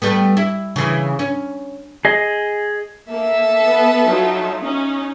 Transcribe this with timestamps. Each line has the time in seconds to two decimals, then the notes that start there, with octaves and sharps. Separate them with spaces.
0.02 G3 A3 B3
0.37 E4
0.76 C#3 E3
1.19 C#4
2.05 G#4 D#5
3.11 A#3 A4 E5
3.64 B3 B4
4.06 F#3 D#4 F4
4.63 C#4 D#4